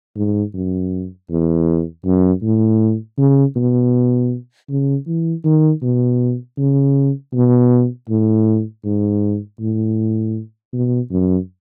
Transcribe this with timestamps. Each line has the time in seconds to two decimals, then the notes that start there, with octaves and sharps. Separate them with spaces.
0.16 G#2
0.54 F#2
1.30 E2
2.05 F#2
2.43 A2
3.18 C#3
3.56 B2
4.69 C#3
5.07 E3
5.44 D#3
5.82 B2
6.58 C#3
7.33 B2
8.09 A2
8.84 G#2
9.60 A2
10.73 B2
11.11 F#2